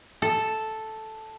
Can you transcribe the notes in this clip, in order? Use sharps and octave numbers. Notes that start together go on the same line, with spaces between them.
A4